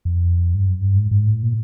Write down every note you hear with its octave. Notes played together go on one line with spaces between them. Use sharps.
F2
G2
F#2
G2
G#2
G#2
A2
A#2